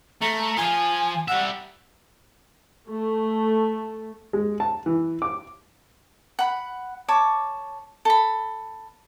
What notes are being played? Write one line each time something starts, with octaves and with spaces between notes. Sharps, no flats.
A3 A#5
F3 F4 G#5
G3 E5 F#5
A3
G#3
A5
E3
D6
F#5 B5
C#5 A5 D6
A4 B5